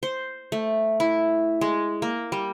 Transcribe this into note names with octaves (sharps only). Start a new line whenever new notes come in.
C5
A3
E4
G#3
A#3
G3